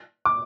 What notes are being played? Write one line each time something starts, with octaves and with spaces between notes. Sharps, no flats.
D6